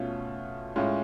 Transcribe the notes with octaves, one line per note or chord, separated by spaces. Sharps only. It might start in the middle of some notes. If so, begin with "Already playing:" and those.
Already playing: B2 A3 C#4 F4
A2 G#3 C#4 F4